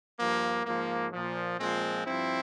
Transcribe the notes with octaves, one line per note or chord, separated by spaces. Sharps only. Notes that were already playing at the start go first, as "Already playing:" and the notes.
G2 F3 A#3
G#2 F3 A#3
A#2 F3
A#2 F3 G#3 C4
G2 F3 C4 E4